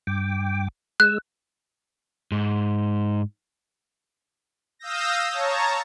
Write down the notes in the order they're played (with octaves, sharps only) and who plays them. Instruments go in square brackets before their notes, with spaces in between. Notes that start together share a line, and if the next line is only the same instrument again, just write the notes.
[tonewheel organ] G2 G5 D6
[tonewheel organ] G#3 E6 [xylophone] F#6
[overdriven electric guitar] G#2
[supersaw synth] F5 D#6 E6 G6 A#6
C#5 A5 A#5